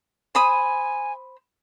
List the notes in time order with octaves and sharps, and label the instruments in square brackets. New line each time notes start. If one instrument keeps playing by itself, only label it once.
[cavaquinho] C5 B5 D#6 [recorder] G#5